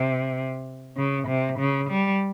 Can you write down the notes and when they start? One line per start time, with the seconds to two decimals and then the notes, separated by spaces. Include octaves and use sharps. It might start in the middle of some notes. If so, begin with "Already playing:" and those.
Already playing: C3
0.97 C#3
1.28 C3
1.59 C#3
1.90 G3